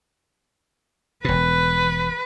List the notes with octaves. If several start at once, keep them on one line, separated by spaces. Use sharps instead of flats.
E1 B2 B4